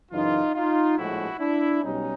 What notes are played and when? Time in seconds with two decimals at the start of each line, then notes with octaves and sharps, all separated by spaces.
0.11 F#2 C#3 E3 D#4 F4
0.54 D#4 F4
0.97 A#1 A2 F3 G#3 E4 F#4
1.39 D4 E4
1.82 B1 B2 G3 C#4 D#4